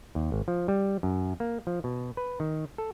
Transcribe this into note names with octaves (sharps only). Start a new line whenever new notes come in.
D#2
G#1
F3
G3
F#2
A#3
F3
B2
B4
D#3
A4